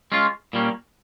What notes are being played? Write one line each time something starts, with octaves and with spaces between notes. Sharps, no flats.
G#3 C#4 F4
A#2 G3 A#3 C#4